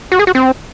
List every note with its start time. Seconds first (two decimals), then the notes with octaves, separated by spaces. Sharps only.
0.12 F#4
0.19 G#4
0.27 F#4
0.35 C4